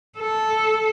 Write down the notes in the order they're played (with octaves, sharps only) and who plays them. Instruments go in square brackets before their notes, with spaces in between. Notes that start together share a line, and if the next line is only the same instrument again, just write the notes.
[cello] A4